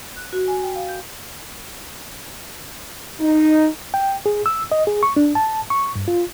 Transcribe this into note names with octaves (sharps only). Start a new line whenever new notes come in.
F#6
F#4
G#5
G5
F5
G6
D#4
G5
G#4
E6
D#5
G#4
C#6
D4
A5
C#6
G2
F4